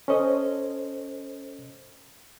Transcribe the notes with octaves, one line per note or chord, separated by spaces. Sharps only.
C#4 A4 C5 D#5